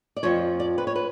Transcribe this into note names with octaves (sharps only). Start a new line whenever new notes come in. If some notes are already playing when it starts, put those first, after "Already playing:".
D5
F2 F3 C#5
D5
B4
C#5
B4